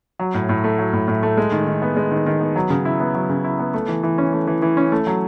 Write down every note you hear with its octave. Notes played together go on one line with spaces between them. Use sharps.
F#3
A2
A2
A3
F#3
A2
A2
A3
G#3
D#3
D#3
B3
G#3
D#3
D#3
B3
F#3
C#3
E4
B3
F#3
C#3
E4
B3
A3
E3
E3
C#4
A3
E3
E3
C#4
A3
F#3